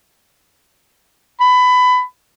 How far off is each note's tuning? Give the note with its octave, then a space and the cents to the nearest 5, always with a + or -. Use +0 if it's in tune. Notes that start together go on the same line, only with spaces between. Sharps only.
B5 +20